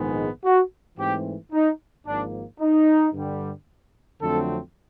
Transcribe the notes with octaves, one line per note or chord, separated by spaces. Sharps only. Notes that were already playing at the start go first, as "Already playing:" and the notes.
Already playing: A#1 G#2 D#3 G#3 B3
F#4
G#2 E3 A3 C4 G4
D#4
G#1 G#2 F3 A#3 D4
D#4
G2 D3 G3
F2 D3 F#3 A3 C4 A4